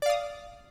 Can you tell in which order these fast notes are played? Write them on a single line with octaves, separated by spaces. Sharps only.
D5 F5 D#6